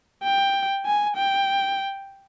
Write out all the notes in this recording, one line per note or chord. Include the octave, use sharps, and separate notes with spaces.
G5
G#5
G5